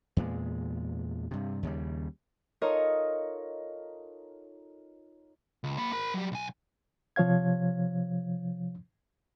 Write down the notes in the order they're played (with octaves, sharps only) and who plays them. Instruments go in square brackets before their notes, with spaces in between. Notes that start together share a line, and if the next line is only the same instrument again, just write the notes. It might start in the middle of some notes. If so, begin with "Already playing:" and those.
[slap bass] E2 A#2 G#3
G2 C3
D#2 C#3 G3
[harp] D#4 F4 A4 A#4 C#5 D#5
[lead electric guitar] C#2
A#3 B5
A#4 B5
F#3 G3
B1 G#5
[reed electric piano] C3 F3 C#5 F5 G#6